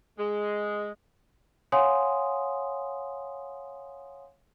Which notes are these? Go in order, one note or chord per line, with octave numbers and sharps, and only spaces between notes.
G#3
C#5 F5 F#5 G#5 C6 D#6